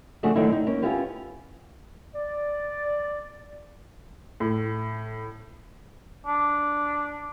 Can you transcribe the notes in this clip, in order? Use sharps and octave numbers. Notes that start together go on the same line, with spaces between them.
C#3 F3 A3 D4 F#4 G#4
D3 D#3 F#3 A3 D#4 E4
D#4
A#3 C#4
B3 C#4 E4 F4 G4 B4
D5
A2
D4